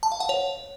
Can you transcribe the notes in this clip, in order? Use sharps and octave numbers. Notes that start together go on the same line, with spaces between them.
A5
F5
F#5
C#5